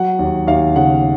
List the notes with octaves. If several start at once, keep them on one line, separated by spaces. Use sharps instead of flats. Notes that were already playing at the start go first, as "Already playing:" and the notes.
Already playing: F#3 F#5
D#2
D#2 F5
C#3 F#5